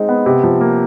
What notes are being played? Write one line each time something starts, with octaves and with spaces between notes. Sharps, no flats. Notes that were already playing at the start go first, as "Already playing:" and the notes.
Already playing: G#3 C4 D#4
B3
C3
F3
A#3